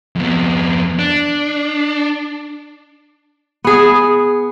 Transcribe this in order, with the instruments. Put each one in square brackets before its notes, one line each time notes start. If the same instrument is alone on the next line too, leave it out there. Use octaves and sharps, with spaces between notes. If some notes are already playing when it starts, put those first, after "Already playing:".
[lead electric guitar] F2 B3
D4
[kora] B3 G#4